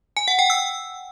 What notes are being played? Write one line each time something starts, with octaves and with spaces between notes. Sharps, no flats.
G#5
F#5
G5
E6